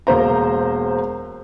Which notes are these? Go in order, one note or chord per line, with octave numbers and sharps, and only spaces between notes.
E1 A#3 C5 A#5